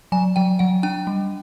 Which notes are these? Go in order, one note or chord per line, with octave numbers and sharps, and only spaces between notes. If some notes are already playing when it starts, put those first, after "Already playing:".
F#3 G#5
F#3 G5
F#3 F#5
D4 G5
G3